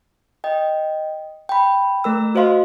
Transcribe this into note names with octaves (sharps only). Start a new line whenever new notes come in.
D#5 G5
G5 B5
A3 A#4 E6
F#4 C5 D#5 F5 C6